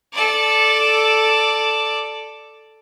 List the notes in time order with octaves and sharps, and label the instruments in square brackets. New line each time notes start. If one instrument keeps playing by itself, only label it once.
[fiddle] A4 D5